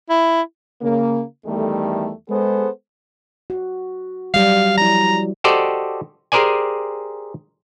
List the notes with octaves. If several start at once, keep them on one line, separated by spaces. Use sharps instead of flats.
E4
C#3 A#3
E2 D#3 G3 A3
G#3 B3 G#4 A4 C5
F#4
F#3 G3 F5
F3 E4 A#5
F#4 G4 A4 C5 D5 D#5
G4 G#4 A#4 C5 D5 G#5